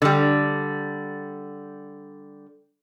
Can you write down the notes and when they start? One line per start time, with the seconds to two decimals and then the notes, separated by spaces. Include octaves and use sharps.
0.02 D3 G3